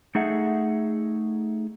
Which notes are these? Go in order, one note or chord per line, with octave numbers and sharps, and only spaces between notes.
A3 D#4 G#4 E5 F#5